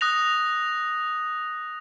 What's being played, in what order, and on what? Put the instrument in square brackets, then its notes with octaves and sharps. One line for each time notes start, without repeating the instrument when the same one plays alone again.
[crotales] D#6 F#6 A#6 F7